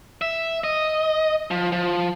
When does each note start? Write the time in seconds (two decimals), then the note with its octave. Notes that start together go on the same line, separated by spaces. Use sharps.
0.22 E5
0.64 D#5
1.51 F3
1.72 F3